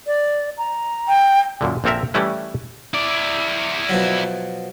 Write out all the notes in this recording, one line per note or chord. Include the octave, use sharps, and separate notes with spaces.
D5
A#5
G5
F#2 A#2 D3
A#1 A#3 C4 A4 A#4 E5
E3 G3 A3 C#4 E4 B4
E4 D5
B2 F3 F#3